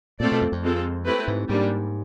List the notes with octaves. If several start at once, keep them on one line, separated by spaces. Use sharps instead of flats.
A#2 A3 C4 F4 A4 D5
B2
F2
F2
G#3 C4 F4 A4
A3 C4 E4 G4 B4
G#2
G#2 G3 A#3 D4